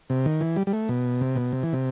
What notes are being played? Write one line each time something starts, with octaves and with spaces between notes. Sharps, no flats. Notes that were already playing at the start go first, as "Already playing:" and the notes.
C3
D#3
E3
G3
G3
A3
B2
C3
B2
C3
E3
C3